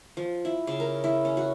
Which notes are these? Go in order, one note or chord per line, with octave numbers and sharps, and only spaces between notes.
F3
E4
C#3
A#4
E4
C#4
F#4